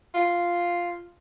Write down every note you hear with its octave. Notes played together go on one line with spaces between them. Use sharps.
F4